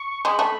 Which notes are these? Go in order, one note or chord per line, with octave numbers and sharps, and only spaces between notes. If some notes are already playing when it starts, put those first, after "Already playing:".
Already playing: C#6
G#3 B5
A3